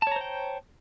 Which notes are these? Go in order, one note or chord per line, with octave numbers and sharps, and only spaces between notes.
C5 C#5 G5 A5 A#5